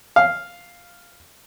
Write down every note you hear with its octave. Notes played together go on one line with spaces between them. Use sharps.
F5